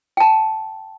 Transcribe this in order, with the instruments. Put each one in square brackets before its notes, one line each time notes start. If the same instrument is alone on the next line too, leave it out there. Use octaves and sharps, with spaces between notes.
[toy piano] G5 A5